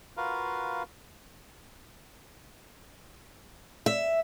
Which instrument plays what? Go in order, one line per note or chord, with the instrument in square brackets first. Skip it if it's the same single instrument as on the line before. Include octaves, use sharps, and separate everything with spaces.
[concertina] F4 F#4 A#4 B4 F5
[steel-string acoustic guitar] E5